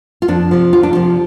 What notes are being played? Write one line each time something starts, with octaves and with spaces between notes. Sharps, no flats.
F4
F2 D4
C3 F3
F2 F4
D4
C3 F3 F4